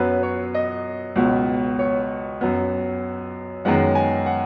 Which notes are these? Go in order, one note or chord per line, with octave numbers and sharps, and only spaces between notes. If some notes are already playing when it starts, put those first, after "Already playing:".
Already playing: F#2 F#3 B3 B4
C#5
D#5
C#2 B2 F#3 B3
C#5
F#2 F#3 B3
F#2 D#3 G#3 B3 F#5
G#5
F#5